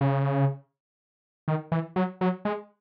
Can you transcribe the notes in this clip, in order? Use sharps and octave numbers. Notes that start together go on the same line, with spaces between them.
C#3
D#3
E3
F#3
F#3
G#3